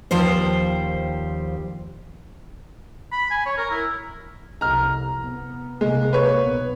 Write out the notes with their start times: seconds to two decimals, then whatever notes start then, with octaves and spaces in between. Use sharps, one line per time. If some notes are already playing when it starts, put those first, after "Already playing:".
0.11 D#2 F3 G3 C5
3.12 B5
3.31 G#5
3.46 C#5
3.58 A#4
3.71 E4
4.61 C2 F2 A#5 F6
5.25 B3
5.81 C2 C3 G#3 A#3
6.13 A#3 B4 C#5
6.44 B1 B3